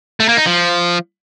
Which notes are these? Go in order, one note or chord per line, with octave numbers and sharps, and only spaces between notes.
A3
A#3
D#4
F3